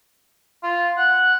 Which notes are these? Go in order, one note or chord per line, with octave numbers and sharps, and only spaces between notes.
F4
F#5